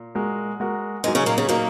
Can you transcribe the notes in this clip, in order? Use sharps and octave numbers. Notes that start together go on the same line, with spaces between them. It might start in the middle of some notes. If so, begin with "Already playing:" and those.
Already playing: A#2
G#3 F#4 A#4
G#3 F#4 A#4
G#2 F#3 G#3 D#4 A#4
C#3 C#4
A#2 A#3
C#3 C#4
A#2 F#3 A#3 D#4 A#4